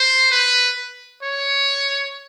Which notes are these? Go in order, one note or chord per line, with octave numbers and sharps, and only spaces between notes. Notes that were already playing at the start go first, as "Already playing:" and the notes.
Already playing: C5
B4
C#5